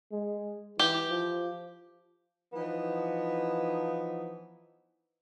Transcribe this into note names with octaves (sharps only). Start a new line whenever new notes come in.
G#3
E3 G4
F3
E3 F3 B3 D#4